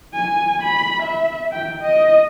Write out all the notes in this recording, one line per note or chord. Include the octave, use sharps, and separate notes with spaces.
G#5
B5
E5
G5
D#5